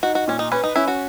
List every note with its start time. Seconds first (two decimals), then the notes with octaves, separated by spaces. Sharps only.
0.03 D#4 F#4
0.15 F#4
0.28 A#2 C#4
0.39 D#4
0.52 C#4 B4
0.64 D#4
0.76 C#4 E4
0.88 F#4